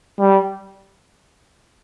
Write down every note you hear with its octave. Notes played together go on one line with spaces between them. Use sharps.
G3